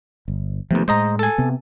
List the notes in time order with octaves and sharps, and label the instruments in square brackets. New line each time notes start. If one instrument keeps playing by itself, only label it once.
[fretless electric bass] G1
[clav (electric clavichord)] D#2 C3 [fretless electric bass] F3 A3 B3
[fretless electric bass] A2 G#3 [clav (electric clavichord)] C5 D#5 A#5
[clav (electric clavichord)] A4 G#5
[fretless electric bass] C3 B3